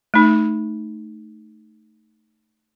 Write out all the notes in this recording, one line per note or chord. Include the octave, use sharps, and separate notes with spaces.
A3 D#4